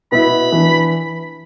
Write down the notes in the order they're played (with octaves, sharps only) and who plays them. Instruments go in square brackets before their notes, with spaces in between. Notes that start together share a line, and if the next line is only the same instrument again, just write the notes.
[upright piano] B2 B3 E4 [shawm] B5
[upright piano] E3 D4